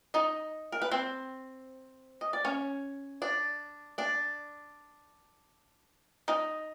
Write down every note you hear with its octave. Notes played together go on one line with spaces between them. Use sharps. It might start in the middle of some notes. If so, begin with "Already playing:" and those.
D#4 D#5
A#4
B4
C4 C5
D#5
D5
C#4 C#5
D4 D5
D4 D5
D#4 D#5